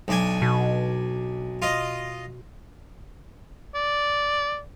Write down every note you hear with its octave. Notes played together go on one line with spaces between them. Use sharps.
B1 D4 G#5
B2
F4 D#5
D5